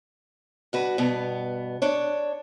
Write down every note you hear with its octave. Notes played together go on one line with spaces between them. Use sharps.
G2 F#4 B4
G2 B2 B3
D4 C#5